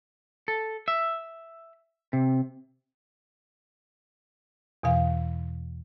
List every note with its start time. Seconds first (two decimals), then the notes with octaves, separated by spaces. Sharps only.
0.48 A4
0.88 E5
2.13 C3
4.83 E2 B2 E3 F5